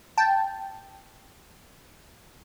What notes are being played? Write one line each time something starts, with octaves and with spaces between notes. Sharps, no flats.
G5 A5